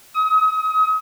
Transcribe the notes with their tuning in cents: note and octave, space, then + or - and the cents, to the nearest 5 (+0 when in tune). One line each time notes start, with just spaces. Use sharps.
D#6 +30